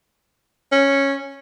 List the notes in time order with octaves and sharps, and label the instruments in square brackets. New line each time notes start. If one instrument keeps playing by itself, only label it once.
[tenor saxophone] C#4